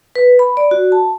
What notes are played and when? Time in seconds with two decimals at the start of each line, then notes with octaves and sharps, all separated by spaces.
0.16 B4
0.39 B5
0.57 D5
0.71 F#4
0.92 A5